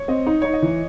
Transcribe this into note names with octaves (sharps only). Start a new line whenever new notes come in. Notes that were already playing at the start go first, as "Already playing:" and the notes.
Already playing: C#5
C4 D#5
D#4
D#4 C#5
D#5
E3